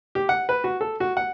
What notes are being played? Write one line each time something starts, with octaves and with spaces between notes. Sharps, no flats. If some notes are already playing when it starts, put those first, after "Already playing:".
G4
F#5
B4
F#4
A4
F#4
F#5